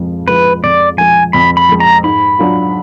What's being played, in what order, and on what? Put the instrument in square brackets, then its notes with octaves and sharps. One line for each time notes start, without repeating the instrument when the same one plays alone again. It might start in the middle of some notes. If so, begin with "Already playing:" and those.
Already playing: [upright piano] F2 F3 G#3
[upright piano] F3 G#3 [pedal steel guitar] B4
[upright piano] F2 [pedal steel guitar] D5
[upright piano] F3 G#3 [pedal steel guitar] G#5
[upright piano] F2 [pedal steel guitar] B5
[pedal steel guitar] B5
[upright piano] F3 G#3
[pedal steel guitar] A#5
[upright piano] G#2 [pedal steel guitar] B5
[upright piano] F#3 D4 F4